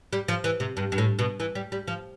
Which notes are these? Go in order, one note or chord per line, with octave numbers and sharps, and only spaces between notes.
G3
F3
E3
C3
G2
G2
A2
B2
E3
G3
G3
F3